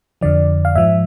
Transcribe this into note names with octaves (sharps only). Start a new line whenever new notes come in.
F2 D3 F3 D5
F5
G#2 F3 E5